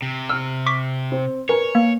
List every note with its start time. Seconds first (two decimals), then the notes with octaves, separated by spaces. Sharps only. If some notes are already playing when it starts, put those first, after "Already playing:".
0.02 C3
0.29 E6 F6
0.66 C#6 D6 B6
1.12 C4
1.49 A#4 B4 C#5 G#5
1.75 A#3